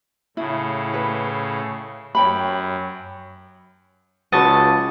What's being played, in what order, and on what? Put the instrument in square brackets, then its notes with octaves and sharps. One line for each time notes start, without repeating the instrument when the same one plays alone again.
[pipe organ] A2 C#3 [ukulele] E4
[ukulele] B4
[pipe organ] F#2 [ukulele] C#5 G5 B5
[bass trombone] C#2 [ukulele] F#4 B4 A5 [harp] D#5 A6